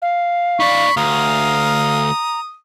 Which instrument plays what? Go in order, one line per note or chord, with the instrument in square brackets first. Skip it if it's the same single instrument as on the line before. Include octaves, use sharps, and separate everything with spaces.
[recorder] F5
[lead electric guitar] D#4 D5 [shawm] B5 [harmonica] C#6
[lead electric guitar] D2 [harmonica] F5 [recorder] A#5 [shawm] D#6